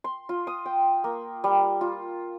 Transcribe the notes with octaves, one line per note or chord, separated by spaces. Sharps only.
C6
F4
D#6
G5
A#3
G3
F4